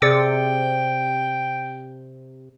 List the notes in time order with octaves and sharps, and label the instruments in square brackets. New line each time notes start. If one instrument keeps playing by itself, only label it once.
[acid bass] C3 [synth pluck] G#4 A6 C#7 [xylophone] D5 D6 E6 [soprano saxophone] G5